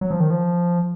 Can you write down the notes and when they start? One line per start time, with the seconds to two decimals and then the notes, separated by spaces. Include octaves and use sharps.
0.01 F#3
0.11 F3
0.20 D#3
0.30 F3